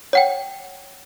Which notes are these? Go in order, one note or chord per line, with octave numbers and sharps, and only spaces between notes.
C#5 F#5 G5